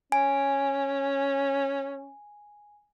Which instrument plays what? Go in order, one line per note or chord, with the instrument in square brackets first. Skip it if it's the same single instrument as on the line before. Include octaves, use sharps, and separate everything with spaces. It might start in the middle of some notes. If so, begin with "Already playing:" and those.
[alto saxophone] C#4 [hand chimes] G#5